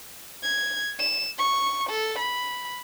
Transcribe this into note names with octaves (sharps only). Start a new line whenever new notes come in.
G#6
E7
C#6
A4
B5